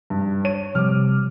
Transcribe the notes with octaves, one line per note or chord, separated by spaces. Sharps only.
G2
C#5 D#7
C3 F3 G3 D6 F6